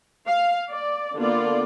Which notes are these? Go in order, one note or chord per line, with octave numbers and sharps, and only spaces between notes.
F5
D5
D3 A#3 B3 F4 D5